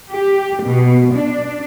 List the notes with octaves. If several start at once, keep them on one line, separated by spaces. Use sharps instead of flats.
G4
B2
D4